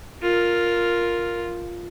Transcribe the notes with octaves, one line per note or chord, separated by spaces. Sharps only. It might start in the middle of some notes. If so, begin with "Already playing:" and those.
F4 A#4